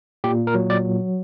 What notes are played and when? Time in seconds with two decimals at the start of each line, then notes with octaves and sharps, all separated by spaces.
0.24 A#2 G4
0.47 A#4
0.55 F#3
0.70 D5